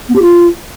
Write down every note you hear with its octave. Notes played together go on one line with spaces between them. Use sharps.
B3
G4
F4